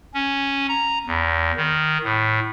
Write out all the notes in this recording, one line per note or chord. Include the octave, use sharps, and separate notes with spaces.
C#4
A#5
E2
D#3
A2